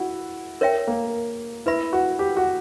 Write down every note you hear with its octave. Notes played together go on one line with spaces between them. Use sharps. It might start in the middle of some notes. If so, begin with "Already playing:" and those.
Already playing: E4 F#4
A#4 C#5 E5 G5
A#3
E4 B4 E5 B5
F#4
G4
F#4